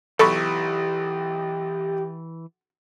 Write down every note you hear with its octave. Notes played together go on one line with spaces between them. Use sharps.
B1 E3 G4 A4 B5 C#6